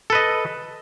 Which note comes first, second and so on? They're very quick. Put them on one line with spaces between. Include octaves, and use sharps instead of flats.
A4 B4 D#5